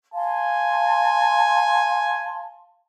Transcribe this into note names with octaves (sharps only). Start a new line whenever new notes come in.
F5 G#5 A5 C6